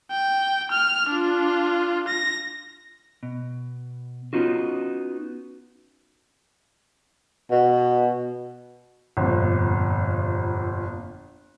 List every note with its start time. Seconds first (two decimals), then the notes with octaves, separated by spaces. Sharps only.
0.11 G5
0.71 F6
1.10 D4 F4
2.08 A#6
3.23 B2
4.33 B3 C#4 D#4 F4 F#4
7.51 B2
9.17 G1 F2 A#2